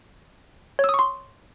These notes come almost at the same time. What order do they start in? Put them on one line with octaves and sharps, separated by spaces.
C#5 E6 D#6 C#6 C6